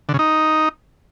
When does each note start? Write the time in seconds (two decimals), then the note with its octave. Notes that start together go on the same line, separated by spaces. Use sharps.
0.09 D3
0.14 C#3
0.19 D#4